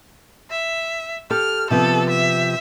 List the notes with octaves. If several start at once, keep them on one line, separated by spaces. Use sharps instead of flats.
E5
G4 A4 F6
C3 F3 B3 A4
E5